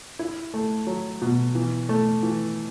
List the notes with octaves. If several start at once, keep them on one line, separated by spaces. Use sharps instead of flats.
E4
A3
F#3
B2
E3
A3
E3